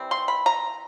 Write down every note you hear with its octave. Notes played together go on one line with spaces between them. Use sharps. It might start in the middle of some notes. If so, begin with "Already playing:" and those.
Already playing: C3 E3 G3 C4
C6
B5
A#5